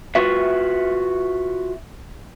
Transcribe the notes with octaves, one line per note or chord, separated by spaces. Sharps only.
F4 F#4 B4 E5